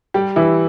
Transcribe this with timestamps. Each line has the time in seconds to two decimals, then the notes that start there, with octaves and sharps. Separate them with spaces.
0.14 G3 G4
0.36 E3 E4